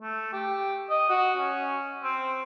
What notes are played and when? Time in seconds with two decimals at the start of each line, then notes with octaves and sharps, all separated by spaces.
0.02 A3
0.33 G4
0.90 D#5
1.09 F#4
1.37 C#4
2.03 C4